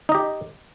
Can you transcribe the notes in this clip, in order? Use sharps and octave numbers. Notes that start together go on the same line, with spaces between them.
D#4 G4 D#5